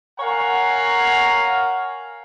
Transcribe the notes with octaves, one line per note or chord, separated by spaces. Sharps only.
A#4 C#5 F5 F#5 G#5 A#5